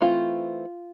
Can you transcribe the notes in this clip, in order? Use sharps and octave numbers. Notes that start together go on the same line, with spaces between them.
E3 A3 C4 F4